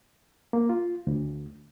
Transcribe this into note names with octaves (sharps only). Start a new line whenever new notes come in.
A#3
F4
D2